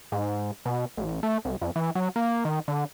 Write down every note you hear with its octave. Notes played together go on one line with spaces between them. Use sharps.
G#2
B2
A1
A3
C2
F2
E3
F#3
A#3
D#3
D3